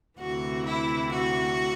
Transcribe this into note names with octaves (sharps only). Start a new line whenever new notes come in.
D2 C3 E3 F#4
E4
F#4